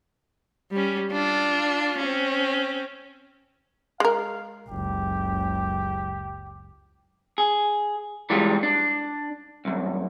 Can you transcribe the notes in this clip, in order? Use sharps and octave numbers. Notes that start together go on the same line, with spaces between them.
G3 C#4
D4 F4
C4 C#4
G#3 A#4 F5
F#1 C#2 G4
G#4
E3 G3 G#3 F4
D4
C2 F#2